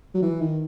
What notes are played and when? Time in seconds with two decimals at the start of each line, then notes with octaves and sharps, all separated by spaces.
0.15 F#3
0.22 E3
0.41 D#3